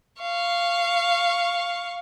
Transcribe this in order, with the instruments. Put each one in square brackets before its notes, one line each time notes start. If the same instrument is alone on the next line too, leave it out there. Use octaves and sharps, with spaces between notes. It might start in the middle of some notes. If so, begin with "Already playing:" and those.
[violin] F5 C#6